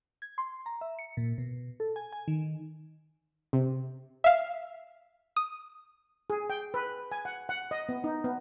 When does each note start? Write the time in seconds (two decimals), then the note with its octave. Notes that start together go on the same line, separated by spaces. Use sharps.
0.22 G#6
0.38 C6
0.66 A#5
0.81 E5
0.99 C#7
1.17 A#2
1.38 B2
1.80 A4
1.96 G#5
2.13 G#5
2.28 D#3
3.53 C3
4.24 E5 F5
5.37 D#6
6.30 G#4
6.50 G5
6.74 B4
7.12 G#5
7.25 F#5
7.49 F#5
7.71 D#5
7.89 B3
8.04 D#4
8.24 B3